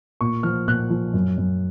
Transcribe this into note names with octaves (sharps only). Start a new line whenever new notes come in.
A#2 C#6
F3 F6
A#2 F#6
F3
F#2
F#2